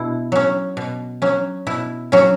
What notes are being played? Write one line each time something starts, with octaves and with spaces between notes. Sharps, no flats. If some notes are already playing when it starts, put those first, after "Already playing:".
Already playing: B2 E4
F#3 C#4
B2
F#3 C#4
B2 E4
F#3 C#4